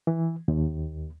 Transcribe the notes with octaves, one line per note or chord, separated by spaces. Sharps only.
E3
D#2